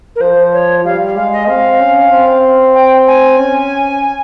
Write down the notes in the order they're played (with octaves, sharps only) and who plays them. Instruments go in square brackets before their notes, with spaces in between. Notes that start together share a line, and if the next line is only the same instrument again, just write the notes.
[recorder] A#4
[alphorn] F3 [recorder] C5
[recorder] C#5
[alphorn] G3 [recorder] F5
[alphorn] G#3 [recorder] F5
[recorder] D#5
[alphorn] C4 [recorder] F5
[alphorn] C#4
C4
[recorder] G5
G#5
[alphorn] C#4